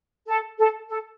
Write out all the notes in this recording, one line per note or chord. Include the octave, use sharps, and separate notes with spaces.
A4
A4
A4